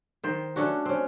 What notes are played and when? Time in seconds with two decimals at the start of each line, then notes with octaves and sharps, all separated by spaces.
0.24 D#3 C5 G5
0.56 A3 C#4 D4 F#4
0.86 C4 C#4